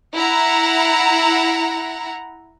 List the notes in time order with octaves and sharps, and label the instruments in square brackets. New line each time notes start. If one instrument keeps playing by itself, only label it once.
[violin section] E4 F#5 A#5